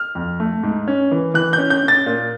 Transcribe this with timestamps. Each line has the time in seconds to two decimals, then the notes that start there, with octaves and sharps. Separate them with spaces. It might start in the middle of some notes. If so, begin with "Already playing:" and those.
Already playing: F6
0.15 F2
0.40 A3
0.63 G#2
0.88 C#4
1.11 E3
1.34 E3 F#6
1.53 G6
1.58 C#4
1.70 G6
1.83 C#4
1.88 A6
2.06 A#2